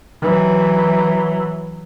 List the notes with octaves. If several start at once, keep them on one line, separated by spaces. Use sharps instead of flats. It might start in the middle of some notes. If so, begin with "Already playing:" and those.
E3 F#3